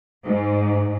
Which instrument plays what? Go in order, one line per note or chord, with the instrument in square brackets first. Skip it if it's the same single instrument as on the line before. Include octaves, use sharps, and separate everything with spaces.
[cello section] G#2